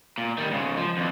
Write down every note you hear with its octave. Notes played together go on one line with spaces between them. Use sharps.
A#2
D#3 G3
G#2 C#3
F3
F2 E3